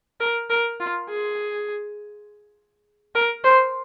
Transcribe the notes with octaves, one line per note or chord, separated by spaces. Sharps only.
A#4
A#4
F4
G#4
A#4
C5